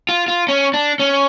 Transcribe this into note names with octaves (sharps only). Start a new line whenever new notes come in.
F4
F4
C#4
D4
C#4